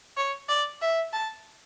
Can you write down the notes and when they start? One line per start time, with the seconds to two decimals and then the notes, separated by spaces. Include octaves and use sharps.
0.17 C#5
0.49 D5
0.82 E5
1.13 A5